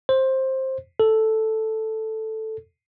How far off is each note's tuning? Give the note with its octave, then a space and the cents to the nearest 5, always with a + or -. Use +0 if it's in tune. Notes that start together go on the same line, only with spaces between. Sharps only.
C5 +15
A4 +0